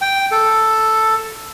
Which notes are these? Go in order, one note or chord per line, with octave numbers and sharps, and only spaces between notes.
G5
A4